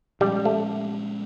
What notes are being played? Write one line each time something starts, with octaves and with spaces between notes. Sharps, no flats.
A#2 F3 G3 G#3 C#4
A3